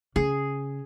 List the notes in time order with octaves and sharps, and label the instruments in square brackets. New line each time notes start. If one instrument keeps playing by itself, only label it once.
[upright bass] C#3 [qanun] G#4